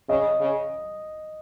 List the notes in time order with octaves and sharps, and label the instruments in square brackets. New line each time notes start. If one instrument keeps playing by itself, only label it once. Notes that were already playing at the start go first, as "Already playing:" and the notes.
[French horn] C#3 [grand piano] D#5
[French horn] C#3